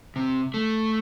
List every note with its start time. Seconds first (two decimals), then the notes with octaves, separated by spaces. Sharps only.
0.16 C3
0.54 A3